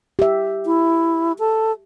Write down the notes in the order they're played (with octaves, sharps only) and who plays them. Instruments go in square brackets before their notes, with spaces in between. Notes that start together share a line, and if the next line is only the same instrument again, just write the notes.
[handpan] G4 E5
[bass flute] E4
A4